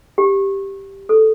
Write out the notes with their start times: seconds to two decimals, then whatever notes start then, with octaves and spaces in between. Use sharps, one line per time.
0.18 G4
1.09 A4